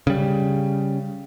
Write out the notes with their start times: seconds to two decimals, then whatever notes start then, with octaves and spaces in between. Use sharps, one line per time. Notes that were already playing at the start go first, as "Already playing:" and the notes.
0.07 C#3 G3